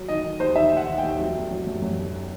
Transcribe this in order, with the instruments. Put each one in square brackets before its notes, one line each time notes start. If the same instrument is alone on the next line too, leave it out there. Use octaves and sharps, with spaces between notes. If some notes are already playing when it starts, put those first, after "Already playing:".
Already playing: [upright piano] F#3
D#3 D#5
D#3
D#2 C5
D#3 E5
D#2 F#5
D#2
D#2 G5
F#3
G1
F#3
F#2
F#2
G1